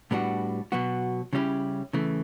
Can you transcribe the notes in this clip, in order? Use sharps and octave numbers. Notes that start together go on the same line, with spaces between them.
A2 G3 B3 D4 F#4
B2 F#3 B3 F#4
C#3 G3 C#4 E4 G4
C#3 E3 A3